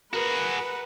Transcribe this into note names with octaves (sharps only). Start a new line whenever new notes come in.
F#4 G#4 A#4 B4 F#5